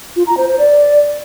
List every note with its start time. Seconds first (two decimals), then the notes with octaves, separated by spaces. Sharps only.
0.16 F4
0.27 A#5
0.37 C5
0.48 C5
0.58 D5